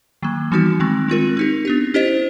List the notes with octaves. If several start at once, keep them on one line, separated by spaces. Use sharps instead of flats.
D#3 F#3 A#3
E3 G3 B3 D#4 F#4
D#3 G#3 C4
G#3 C4 F4 A#4
C4 D#4 G4
B3 D4 G4
C#4 E4 G4 C5 D#5